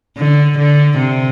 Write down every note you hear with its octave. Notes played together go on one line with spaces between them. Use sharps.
D3
D3
C3